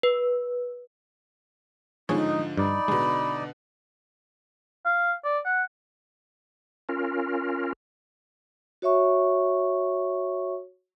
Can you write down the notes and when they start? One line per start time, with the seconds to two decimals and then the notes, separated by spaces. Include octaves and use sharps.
0.03 B4
2.09 G#2 D3 F3 D#4 G#4 C#5
2.57 G2 D#4 D5 B5
2.88 B2 D3 G#3
4.85 F5
5.24 D5
5.45 F#5
6.89 C#4 F4 A#4
8.82 F#4 C#5 E5 C#6